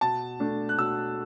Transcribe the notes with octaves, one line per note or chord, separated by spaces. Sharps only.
B2 A5
A3 D4
F#6
B2 E6